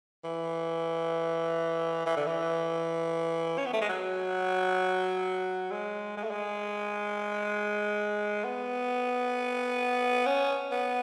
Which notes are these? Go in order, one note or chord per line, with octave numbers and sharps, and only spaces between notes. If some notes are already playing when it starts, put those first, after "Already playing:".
E3
E3
D3
E3
C#4
B3
A3
G#3
F#3
G#3
G#3
A3
G#3
B3
C#4
B3